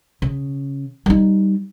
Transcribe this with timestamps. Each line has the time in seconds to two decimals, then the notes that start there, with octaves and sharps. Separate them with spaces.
0.22 C#3
1.06 G3 D#4